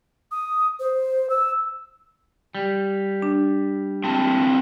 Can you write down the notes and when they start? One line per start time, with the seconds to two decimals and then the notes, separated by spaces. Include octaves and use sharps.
0.31 D#6
0.80 C5
1.30 E6
2.55 G3
3.22 D4
4.04 C4 E4 A5